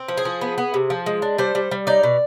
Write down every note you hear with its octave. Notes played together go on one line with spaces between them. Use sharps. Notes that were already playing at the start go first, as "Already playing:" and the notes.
Already playing: C4
F3
G#4
F3
B3
B3
C3
F3
G#3
D4
G3 C5
G3
G3
D#4 D5
B2